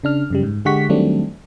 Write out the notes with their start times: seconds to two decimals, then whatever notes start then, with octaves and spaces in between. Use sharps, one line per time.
0.04 C#3 D4 F6
0.30 F#2 C#3 G3
0.43 G#2
0.65 D3 G#3 G4 F#5 C#6 B6
0.89 D#3 F#3 G3 A3 C4 D4